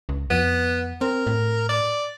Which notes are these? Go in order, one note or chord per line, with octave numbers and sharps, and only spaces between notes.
C#2
F2 B3
C4 A#4
A2
D5